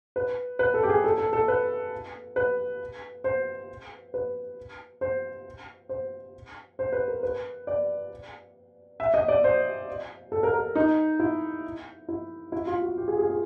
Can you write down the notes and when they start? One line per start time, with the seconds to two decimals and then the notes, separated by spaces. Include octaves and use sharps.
0.16 B4
0.59 B4
0.74 A4
0.83 G4
0.89 G#4
1.04 A4
1.18 A4
1.33 A4
1.48 B4
2.36 B4
3.24 C5
4.14 B4
5.01 C5
5.89 C5
6.79 C5
6.92 B4
7.08 A#4
7.23 B4
7.67 D5
9.00 E5
9.14 D#5
9.28 D5
9.44 C5
10.32 A4
10.43 A#4
10.53 A#4
10.75 D#4
11.19 E4
12.08 E4
12.52 E4
12.67 F4
12.82 F#4
12.97 G4
13.08 G#4
13.19 G#4
13.30 G#4